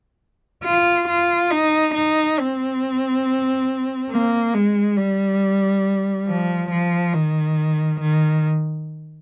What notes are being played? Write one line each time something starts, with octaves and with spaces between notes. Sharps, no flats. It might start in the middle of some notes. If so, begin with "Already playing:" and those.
F4
F4
D#4
D#4
C4
A#3
G#3
G3
F3
F3
D#3
D#3